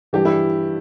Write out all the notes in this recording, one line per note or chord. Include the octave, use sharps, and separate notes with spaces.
G2 E3 G3 G4
E4